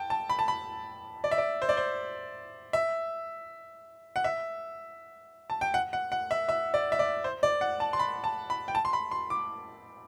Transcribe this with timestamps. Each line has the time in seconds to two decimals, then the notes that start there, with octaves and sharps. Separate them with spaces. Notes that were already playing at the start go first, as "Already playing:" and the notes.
Already playing: G5 A5
0.10 A5
0.30 B5
0.39 A5
0.48 B5
1.24 D5
1.31 E5
1.38 D5
1.62 C5
1.69 D5
1.77 C5
2.73 E5
4.16 F#5
4.24 E5
5.50 A5
5.61 G5
5.74 F#5
5.93 F#5
6.12 F#5
6.31 E5
6.49 E5
6.74 D5
6.92 E5
6.99 D5
7.24 C5
7.43 D5
7.61 F#5
7.80 A5
7.93 C6
7.99 B5
8.24 A5
8.50 B5
8.68 G5
8.75 A5
8.85 C6
8.93 B5
9.11 C6
9.30 D6